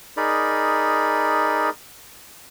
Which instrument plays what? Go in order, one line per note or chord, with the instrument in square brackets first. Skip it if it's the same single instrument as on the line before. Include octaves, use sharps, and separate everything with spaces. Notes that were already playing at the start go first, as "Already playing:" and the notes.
[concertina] D#4 G#4 A#4 D5 B5